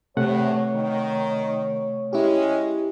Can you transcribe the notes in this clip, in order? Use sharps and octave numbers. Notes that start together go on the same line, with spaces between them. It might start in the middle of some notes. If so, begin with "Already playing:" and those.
E2 A2 C3 A3 C#5 F#5
D#3
G#3 C#4 E4 G4